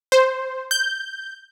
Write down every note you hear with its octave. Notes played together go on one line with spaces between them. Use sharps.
C5
G6